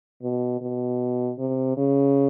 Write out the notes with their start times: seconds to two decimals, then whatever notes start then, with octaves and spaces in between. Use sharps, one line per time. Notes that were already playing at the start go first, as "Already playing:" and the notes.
0.22 B2
0.61 B2
1.38 C3
1.77 C#3